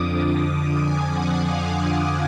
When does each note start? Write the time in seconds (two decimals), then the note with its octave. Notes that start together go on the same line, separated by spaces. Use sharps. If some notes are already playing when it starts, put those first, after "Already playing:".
Already playing: F2 D3 F3 D6 D#6
0.80 G#5
1.12 F#5
1.42 F5